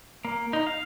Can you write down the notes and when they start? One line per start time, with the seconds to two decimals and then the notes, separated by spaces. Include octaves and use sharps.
0.25 A#3
0.53 D#4
0.67 F5